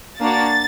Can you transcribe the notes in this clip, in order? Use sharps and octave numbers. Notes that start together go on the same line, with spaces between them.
A#3 D4 F#4 A6